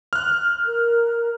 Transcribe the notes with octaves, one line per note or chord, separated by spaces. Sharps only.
F6 F#6
A#4